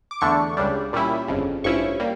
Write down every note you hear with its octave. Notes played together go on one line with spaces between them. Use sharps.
D6
E2 D3 A3 D4 C#6
C#2 C#3 G3 D4
A#2 G3 C#4 E4
G1 F2 C#3
A1 G2 F3 C#4 E4 C#6
G3 A#3